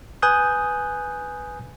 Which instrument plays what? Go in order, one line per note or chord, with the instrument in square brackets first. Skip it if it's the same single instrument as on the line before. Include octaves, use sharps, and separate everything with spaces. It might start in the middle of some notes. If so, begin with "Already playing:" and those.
[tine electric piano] B4 G#5 D#6 F#6 G6